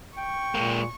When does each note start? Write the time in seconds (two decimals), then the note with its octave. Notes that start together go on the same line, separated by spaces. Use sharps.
0.17 G5 C#6
0.55 A#2 G#3 A#3